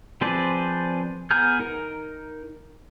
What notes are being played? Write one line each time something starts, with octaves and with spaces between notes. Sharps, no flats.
F3 C4 G#4 B4 D5
B3 G#4 A#5 F6 G6
D#4 A#4